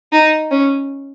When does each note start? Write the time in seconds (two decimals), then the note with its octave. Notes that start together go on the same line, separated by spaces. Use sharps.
0.13 D#4
0.51 C#4